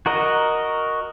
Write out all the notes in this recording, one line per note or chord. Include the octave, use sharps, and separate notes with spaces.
F#4 A#4 D#5